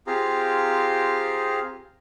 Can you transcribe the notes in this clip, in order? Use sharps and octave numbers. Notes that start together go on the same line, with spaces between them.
C4 F4 G4 G#4 F5 A#5